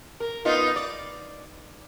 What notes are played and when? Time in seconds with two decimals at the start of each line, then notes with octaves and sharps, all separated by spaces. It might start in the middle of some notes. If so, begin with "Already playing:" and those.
0.20 A#4
0.45 B3 D#4 F4
0.76 D5